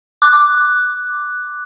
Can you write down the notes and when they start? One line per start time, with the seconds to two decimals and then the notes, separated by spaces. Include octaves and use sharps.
0.22 D6 F#6